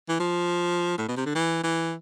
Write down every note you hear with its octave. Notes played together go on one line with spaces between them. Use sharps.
E3
F3
A2
B2
C3
D3
E3
E3